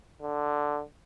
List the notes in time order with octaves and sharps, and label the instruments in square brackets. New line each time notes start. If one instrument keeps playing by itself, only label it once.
[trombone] D3